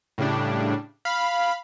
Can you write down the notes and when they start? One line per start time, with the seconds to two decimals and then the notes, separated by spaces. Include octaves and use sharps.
0.18 A2 C#3 G3 D4
1.05 F5 B5